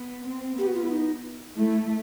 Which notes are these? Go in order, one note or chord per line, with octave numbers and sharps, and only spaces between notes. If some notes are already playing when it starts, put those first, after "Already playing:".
Already playing: B3
C4
B3 G4
F#4
F4
E4
D#4
A3 E4